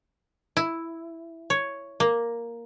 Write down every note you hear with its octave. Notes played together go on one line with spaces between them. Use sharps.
E4
C#5
A#3